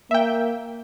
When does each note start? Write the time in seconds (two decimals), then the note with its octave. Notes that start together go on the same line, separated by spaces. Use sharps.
0.11 A#3 E5 G5